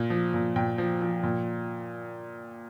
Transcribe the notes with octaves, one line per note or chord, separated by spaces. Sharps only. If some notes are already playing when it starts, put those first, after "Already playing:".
Already playing: A#2
F3
A#2
A#2 G5
F3
F3
A#2